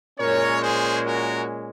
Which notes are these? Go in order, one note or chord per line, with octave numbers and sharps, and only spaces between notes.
A#2 G#3 C#4 A#4 C#5
G#4 C5
F#4 A#4